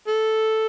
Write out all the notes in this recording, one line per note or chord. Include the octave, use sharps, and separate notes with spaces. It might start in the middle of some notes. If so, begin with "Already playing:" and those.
A4